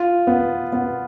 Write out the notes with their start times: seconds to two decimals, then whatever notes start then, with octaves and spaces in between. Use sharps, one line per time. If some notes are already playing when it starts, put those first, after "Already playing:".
Already playing: F4
0.27 B3
0.73 B3